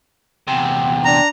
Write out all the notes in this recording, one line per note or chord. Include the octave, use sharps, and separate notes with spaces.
E2 C3 G5
D4 A#5